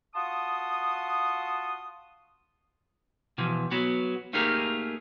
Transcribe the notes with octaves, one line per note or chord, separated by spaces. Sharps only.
F4 F#4 A5 C6 D#6
B2 E3 F3
F#3 B3 F#4
A3 A#3 D#4 G4 G#4 A#4